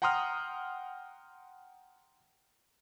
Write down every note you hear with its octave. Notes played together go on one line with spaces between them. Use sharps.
F#5 G5 A#5 C6 D#6 F6